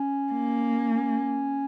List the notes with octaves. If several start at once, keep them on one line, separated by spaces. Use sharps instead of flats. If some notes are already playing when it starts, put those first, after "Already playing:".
Already playing: C#4
A#3
C#4